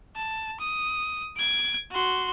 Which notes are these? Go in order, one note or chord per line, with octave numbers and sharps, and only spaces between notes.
A5
D#6
G#6 D7
F#4 C6